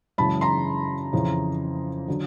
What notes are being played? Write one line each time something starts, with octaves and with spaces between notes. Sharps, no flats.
F#2 C#3 E3 G#3 A5 B5
A#5 C6
F2 C#3 E3
D3 F#3